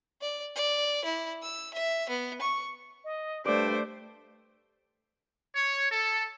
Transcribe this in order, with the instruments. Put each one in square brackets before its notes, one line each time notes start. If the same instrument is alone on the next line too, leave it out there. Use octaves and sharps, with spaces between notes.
[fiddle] D5
D5
E4
E6
E5
B3
C#6
[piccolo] D#5
[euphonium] G2 [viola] A3 C5 [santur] D5 [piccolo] D7
[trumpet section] C#5
A4